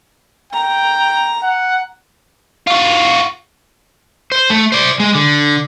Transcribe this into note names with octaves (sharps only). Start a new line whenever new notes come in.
G5 A#5
F#5
F4 F#4
C5
A3
C5 D5
G#3
D3